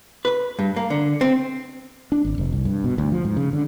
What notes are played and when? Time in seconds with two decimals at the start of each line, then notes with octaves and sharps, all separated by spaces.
0.25 B4
0.59 G2
0.76 A#3
0.90 D3
1.21 C4
2.12 D4
2.25 G#1
2.38 F1
2.52 C2
2.65 G2
2.84 B2
2.98 D2
3.12 F3
3.25 G#2
3.37 C#3
3.53 D3